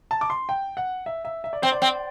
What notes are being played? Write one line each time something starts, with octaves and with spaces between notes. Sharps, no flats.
A5
D6
C6
G5
F#5
E5
E5
E5
D5
C4 C5
D5
C4